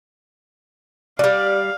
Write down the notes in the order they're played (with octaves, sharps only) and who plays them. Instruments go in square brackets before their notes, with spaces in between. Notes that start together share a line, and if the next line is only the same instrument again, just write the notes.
[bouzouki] F#3 G3 [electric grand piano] D5 [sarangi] F5